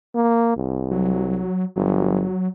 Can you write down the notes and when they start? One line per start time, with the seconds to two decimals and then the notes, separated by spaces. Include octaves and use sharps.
0.15 A#3
0.57 C2
0.91 F#3
1.76 G1 F#3